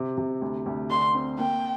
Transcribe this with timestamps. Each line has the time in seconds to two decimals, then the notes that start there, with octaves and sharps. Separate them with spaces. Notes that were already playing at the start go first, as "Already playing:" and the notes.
Already playing: C3 C4
0.18 C3
0.42 D2
0.66 D2
0.90 D3 C6
1.15 C4
1.39 A#3 G5